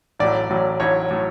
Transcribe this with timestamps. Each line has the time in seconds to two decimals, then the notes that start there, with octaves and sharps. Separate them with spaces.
0.19 A1 A2 F#3 D5
0.49 A1 A2 F#3
0.80 A1 A2 F#3 C#5
1.11 A2 F#3